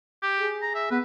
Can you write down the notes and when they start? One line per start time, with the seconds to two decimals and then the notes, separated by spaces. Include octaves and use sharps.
0.22 G4
0.39 G#4
0.62 A#5
0.75 E5
0.91 B3 B4